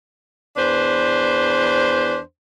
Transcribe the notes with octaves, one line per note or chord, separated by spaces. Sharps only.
E2 D4 B4 C5